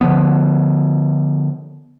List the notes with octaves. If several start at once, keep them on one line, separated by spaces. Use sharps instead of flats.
D3 F3 B3